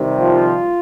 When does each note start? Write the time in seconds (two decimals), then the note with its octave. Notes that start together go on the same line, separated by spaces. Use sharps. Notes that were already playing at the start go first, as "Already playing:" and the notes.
Already playing: C3 D#3 G3
0.19 F3 F4